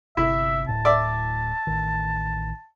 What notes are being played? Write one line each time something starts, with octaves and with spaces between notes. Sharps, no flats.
G1 C3 E4 E5
D1 A2 A5
D5 E5
A1 D#3